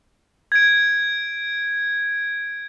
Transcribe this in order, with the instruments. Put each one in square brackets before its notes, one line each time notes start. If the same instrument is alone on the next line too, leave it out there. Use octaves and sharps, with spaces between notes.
[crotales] G#6 D7